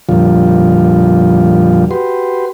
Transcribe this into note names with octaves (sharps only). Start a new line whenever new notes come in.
F2 A#2 D3 F3 G3 F4
F#4 G4 B4 C6